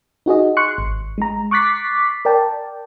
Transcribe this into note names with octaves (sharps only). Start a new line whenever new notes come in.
D#4 F#4 G#4 D#5
C6 C#6 F#6 C#7
G#1
G#3 A#5
C#6 D6 F#6 A6 B6 C7
A#4 D5 G5 A5